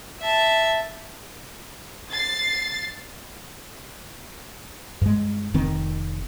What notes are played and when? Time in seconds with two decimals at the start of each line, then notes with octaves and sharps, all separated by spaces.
0.21 E5 A5
2.11 A6 C7
5.01 G2 G#3
5.54 F1 D#3 C4